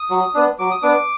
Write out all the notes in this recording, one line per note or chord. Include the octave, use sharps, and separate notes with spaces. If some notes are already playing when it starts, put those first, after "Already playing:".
Already playing: D#6
F#3
B3 D4
F#3 D6
D#6
B3 D4 D6